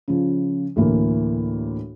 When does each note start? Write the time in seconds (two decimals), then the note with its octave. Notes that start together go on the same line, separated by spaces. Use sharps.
0.08 C#3 F3
0.76 D2 A2 E3 A#3